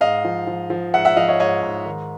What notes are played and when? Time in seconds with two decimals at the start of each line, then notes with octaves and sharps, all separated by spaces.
0.01 G#2 D#5 F5
0.25 F3
0.47 F3
0.70 F3
0.94 G#2 E5 F#5
1.05 E5 F#5
1.16 F3 D#5 F5
1.28 C#5 D#5
1.40 G#2 C#5 D#5
1.63 G#2
1.86 D#3